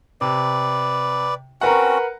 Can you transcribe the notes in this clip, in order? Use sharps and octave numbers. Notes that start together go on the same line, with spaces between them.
C3 B4 D5
C4 C#4 F#4 A#4 B4 F#5